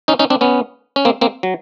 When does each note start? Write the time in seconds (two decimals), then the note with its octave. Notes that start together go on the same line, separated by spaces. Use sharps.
0.08 C#4 D#4
0.19 C#4 D#4
0.30 C4 D4
0.41 B3 C#4
0.96 C#4
1.05 A#3 C4
1.21 A#3 C4
1.43 F#3